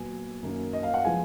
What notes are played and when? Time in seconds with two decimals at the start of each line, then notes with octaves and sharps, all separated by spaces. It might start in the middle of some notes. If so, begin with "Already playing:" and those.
Already playing: A#2 F#3 B3 G#5
0.43 F#2 D#3 A#3
0.73 D#5
0.83 F5
0.94 F#5
1.04 F3 G#3 B3 G#5